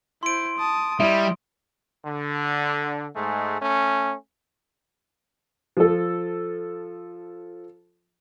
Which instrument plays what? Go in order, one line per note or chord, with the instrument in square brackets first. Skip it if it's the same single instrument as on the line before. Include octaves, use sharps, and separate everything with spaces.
[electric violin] E4 C5 [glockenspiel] C6 D7
[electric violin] A5 D#6
[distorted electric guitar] G3 [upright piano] E4 [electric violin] D#5
[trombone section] D3
G#2 G#3 A3
A3 C#4
[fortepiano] F3 A4